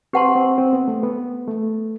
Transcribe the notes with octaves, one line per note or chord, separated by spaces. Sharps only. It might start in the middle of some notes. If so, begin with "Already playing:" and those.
C4 G4 B4 F#5 A5 C6
C4
C4
B3
A3
B3
A3